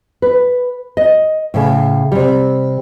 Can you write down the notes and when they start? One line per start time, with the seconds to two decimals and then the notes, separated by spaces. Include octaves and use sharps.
0.22 B4
0.97 D#5
1.54 A2 C#3
2.12 C3 G3